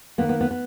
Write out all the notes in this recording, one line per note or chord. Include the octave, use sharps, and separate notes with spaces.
D#3 A#3 B3
B3
B3
B3